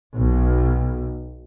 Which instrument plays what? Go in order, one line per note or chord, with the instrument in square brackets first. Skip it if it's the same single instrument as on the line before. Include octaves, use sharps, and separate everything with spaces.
[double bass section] B1